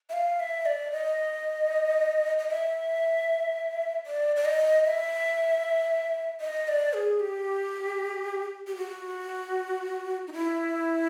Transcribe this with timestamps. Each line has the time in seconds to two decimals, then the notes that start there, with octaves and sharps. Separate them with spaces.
0.09 E5
0.13 F5
0.40 E5
0.66 D5
0.92 D#5
2.39 D#5
2.49 E5
4.06 D5
4.36 D5
4.45 D#5
4.84 E5
6.41 D#5
6.68 D5
6.93 G#4
7.20 G4
8.67 G4
8.77 F#4
10.28 D#4
10.33 E4